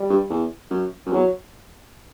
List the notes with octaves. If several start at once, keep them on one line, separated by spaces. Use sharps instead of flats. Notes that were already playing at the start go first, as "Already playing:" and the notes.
Already playing: G3
G2
E2
F#2
F#2
E2 F#3